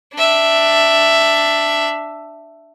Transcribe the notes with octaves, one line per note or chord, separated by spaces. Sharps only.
D4 E5